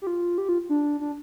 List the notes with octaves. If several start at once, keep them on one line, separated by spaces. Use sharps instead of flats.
G4
F4
G4
F4
D4
D4